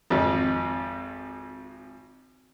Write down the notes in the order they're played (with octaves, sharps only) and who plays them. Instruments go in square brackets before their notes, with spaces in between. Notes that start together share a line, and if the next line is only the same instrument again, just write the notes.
[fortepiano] G#1 F2